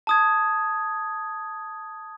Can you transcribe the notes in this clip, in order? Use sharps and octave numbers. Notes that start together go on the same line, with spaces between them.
A5 D#6 G#6